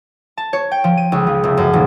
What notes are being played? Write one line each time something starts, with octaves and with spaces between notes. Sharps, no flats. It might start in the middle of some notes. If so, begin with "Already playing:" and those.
A5
C#5
G5
F3
D#7
C#2
F3
F1
F#2
D#1